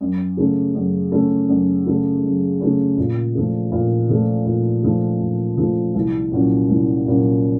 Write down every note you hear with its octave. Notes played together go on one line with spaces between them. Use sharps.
F#2
C#3 A3 C#4
F#2
C#3 A3 C#4
F#2
C#3 A3 C#4
F#2
C#3 A3 C#4
A#2
F3 A3
A#2
F3 A3
A#2
F3 A3
A#2
F3 A3
C2
A#2 F#3 A#3 C#4
C2
A#2 F#3 A#3 C#4